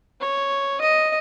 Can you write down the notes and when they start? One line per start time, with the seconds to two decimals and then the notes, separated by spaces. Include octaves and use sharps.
0.21 C#5
0.81 D#5